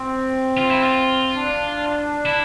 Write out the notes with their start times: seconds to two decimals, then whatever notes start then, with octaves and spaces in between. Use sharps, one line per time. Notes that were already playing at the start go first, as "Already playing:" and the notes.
Already playing: C4
0.57 F4
0.70 E4
0.83 F4
1.35 D4
2.25 E4